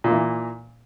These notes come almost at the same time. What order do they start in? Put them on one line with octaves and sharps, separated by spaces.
A#2 A#3 E3